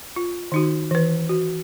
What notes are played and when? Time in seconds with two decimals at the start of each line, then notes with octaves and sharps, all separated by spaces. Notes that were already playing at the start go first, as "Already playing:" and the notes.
0.16 F4
0.52 D#3 D#4 F#4
0.91 E3 B4
1.29 F#4